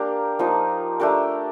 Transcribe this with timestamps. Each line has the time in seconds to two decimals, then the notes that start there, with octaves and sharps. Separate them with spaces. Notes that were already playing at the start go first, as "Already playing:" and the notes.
Already playing: A#3 D4 G4 A#4
0.39 F3 A#3 D#4
1.00 A3 D4 G4 A#4